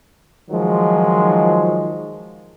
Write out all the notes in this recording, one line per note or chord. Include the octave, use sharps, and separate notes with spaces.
D#3 F3 F#3 G#3